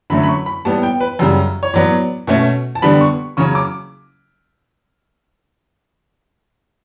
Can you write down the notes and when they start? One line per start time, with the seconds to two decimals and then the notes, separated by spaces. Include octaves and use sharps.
0.10 D3 F#3 A3 C#4 B5
0.23 B5
0.29 C#6
0.46 B5
0.65 A2 G3 B3 A5
0.83 G5
1.00 B4
1.19 F#2 C#3 G3
1.63 C#5
1.74 A2 F#3 B3 D5
2.27 B2 A3 C#4
2.75 A5
2.82 D3 G3 B3 D4 B5
3.01 C#6
3.37 C#3 F#3 C#4 C#6
3.55 D6